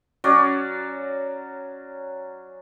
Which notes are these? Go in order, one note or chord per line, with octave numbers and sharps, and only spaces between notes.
F#3 C#4 F#4 D5